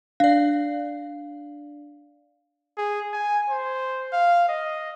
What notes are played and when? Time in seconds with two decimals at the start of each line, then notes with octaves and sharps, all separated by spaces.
0.20 D4 D5 F5
2.77 G#4
3.13 G#5
3.50 C5
4.13 F5
4.49 D#5